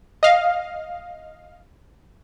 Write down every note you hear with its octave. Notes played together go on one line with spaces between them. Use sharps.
D#5 F5